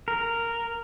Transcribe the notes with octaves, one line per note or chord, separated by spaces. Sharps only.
A#4